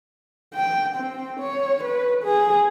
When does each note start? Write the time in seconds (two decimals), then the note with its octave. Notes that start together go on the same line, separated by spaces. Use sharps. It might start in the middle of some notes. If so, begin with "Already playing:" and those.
0.55 G5
0.97 C4
1.40 C#5
1.84 B4
2.24 G#4